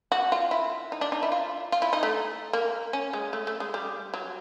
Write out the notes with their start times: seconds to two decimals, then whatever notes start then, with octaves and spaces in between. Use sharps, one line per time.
0.12 F#4
0.32 F4
0.51 E4
0.92 D#4
1.01 D4
1.12 D#4
1.23 E4
1.32 F4
1.72 F4
1.82 E4
1.93 D#4
2.03 A3
2.53 A#3
2.93 C#4
3.13 G#3
3.33 A3
3.47 A3
3.60 G#3
3.74 G3
4.14 F#3